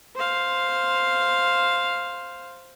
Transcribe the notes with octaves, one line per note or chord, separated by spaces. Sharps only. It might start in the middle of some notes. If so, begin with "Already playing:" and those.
C5 F5